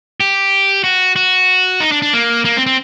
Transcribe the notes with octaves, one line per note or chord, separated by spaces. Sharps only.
G4
F#4
F#4
D#4
D4
D4
A#3
A#3
C4
C4